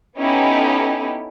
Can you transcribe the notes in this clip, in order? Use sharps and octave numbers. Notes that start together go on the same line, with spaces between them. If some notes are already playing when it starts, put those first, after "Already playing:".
B3 C#4 D#4 E4 G4 A4